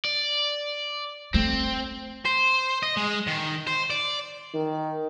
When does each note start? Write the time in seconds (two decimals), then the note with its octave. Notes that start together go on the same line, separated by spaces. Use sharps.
0.05 D5
1.34 A3 C4
2.25 C5
2.83 D#5
2.97 G#3
3.27 D#3
3.67 C5
3.90 D5
4.54 D#3